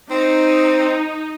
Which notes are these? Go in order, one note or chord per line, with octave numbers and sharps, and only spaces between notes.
C4 D#4